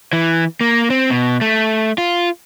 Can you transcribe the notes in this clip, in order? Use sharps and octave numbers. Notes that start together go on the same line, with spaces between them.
E3
A#3
C4
B2
A3
F4